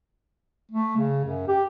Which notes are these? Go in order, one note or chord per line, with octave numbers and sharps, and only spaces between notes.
A3
C#3
F#2
G4